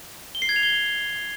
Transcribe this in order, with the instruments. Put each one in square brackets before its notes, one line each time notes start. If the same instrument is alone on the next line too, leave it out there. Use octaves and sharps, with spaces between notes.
[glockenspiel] G7
C7
G#6
F7
G7